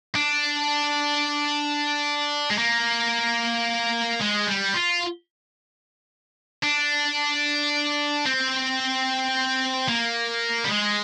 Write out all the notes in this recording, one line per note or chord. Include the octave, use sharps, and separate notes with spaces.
D4
G#3
A#3
G#3
G3
F4
D4
C4
A#3
G3
G#3